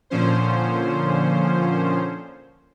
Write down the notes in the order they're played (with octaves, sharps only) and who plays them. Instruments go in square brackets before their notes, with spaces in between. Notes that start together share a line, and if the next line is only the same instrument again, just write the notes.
[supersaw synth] A#2 D3 F3 C#4 C5